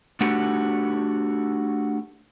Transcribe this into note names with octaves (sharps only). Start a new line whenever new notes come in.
A3 D4 F#4 G4 A4